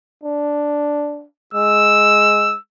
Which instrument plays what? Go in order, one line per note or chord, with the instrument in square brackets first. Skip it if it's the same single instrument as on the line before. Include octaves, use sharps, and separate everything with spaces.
[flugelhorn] D4
[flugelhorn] G#3 [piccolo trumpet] E6